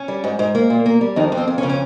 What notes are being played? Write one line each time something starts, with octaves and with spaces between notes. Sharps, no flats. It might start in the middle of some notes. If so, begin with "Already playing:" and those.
Already playing: C#4
G3
G#2
G#2
A#3
A#2
A#3
G3
F2 D#3 D#4
F2
C4
F2
C#4
C#3
C#4